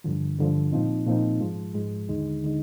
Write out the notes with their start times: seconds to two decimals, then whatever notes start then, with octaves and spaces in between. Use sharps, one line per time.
0.04 G2 D3 F3
0.38 G2 D3 F3
0.72 A#2 F3 C4 D#4
1.06 A#2 F3 C4 D#4
1.40 G#2 F3 G#3
1.74 G#2 F3 G#3
2.09 D#2 D3 G#3 D#4
2.44 D3 G#3 D#4